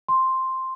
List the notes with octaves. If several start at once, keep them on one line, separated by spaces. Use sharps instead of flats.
C6